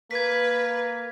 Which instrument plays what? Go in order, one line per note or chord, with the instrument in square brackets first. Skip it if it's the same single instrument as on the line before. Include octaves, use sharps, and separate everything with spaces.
[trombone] A#3 [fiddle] B4 [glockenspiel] G#6 B6